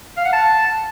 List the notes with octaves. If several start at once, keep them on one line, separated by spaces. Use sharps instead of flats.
F5
F#5
A5